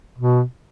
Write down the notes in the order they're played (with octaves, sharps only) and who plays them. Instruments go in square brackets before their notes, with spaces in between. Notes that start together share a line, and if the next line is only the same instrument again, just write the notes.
[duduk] B2